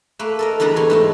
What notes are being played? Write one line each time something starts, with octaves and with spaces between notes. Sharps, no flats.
A3 A#3 B4
A4 A#4 D#5
E2 D3 G3 B3 A#5
B2 C#5 C6
G#2 A3 D#4